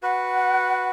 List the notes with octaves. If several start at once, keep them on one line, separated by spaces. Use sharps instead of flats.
F#4 B4 F#5